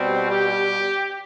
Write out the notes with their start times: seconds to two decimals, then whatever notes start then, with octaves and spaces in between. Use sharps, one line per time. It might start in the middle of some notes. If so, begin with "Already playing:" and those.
Already playing: B2 G3 C4
0.29 G4